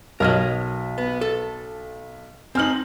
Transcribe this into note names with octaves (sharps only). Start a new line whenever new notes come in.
B1 A#4 C#5 D#5 F6
B3
A4
C4 D#4 G#5 F6 F#7